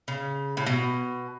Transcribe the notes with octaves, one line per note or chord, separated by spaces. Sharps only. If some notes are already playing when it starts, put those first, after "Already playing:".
C#3
A2
B2